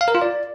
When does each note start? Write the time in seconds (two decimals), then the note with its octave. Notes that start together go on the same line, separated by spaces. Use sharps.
0.01 F5
0.08 A#4
0.15 F4
0.22 D5